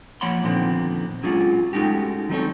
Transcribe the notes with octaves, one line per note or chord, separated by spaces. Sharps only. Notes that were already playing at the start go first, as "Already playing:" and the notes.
F3 A#3 C#5 F#5 B5 C6
A#2 D3 D#3 F3 B3 C4
F#3 G#3 C#4 D4 F4 F#4
G#3 A3 C#4 D#4 F#4 G4
D#3 F#3 C4 D#4 A4 C#5